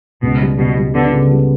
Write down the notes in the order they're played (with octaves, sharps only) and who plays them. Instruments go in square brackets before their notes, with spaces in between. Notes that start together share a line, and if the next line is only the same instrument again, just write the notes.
[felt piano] C#2 [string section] B2
[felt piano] G3
[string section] B2 [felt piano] G3
[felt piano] G3
[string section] D3 [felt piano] B3
[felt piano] C#3
G3